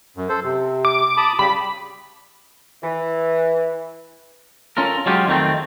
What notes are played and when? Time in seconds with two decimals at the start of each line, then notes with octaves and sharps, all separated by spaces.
0.17 F#2
0.29 A4 C5
0.43 C3
0.85 D6
1.17 A5 B5 D#6
1.39 C#3 G3 G4 B5
2.83 E3
4.77 C#4 F4 A4 A#4
5.06 F#3 G#3 C#4 F4 G4
5.28 F2 D#3 A3 C4